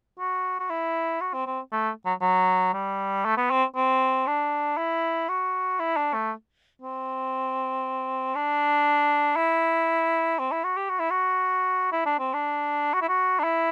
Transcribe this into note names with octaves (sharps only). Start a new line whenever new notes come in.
F#4
F#4
E4
F#4
C4
C4
A3
F#3
F#3
G3
A3
B3
C4
C4
D4
E4
F#4
E4
D4
A3
C4
D4
E4
C4
E4
F#4
G4
F#4
E4
F#4
E4
D4
C4
D4
F#4
E4
F#4
D4
E4